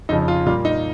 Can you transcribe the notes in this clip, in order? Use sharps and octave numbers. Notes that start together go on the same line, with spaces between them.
F2 C#3 F3 D#4
F4
A#2 G3 A#3 F4
D#4